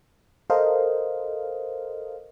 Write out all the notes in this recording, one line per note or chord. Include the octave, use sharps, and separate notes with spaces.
A4 A#4 C5 D#5 F5